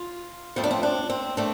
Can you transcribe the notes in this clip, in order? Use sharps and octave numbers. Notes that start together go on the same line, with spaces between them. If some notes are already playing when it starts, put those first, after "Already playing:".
Already playing: F4
F2 F3 A3 C4
D4
C4
D4
C4
A3 C4 D4